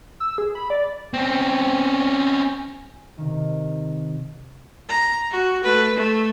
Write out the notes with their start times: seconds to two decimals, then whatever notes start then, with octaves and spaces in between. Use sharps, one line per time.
0.20 E6
0.38 G#4
0.55 B5
0.70 D5
1.14 C4 C#4
3.18 C3 D#3
4.89 A#5
5.31 F#4
5.64 A3 B4
5.96 A3